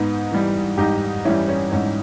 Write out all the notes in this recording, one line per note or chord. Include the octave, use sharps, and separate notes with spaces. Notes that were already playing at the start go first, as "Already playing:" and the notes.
Already playing: G#2 B3 D#4
E3 G3
G#2 D#4 G4
E3 G3 C#4 E4
C#4
G#2 C#4